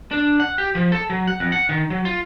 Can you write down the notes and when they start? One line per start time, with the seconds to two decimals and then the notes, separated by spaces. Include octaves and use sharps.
0.11 D4
0.40 F#5
0.58 G4
0.75 F3
0.92 A4
1.10 F#3
1.28 F#5
1.40 F2
1.52 F#5
1.69 D#3
1.90 F#3
2.05 F4